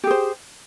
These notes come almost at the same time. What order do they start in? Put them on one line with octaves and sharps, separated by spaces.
G4 G#4 C5